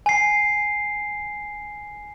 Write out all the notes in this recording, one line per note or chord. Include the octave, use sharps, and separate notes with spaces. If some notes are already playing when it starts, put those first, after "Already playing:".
G#5 C7